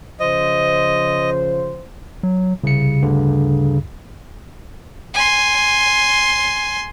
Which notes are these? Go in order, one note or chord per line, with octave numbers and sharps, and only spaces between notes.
C#3 F3 C5 D#5
F#3
C2 C#3 C#7
D2 G2 D3
G#5 C6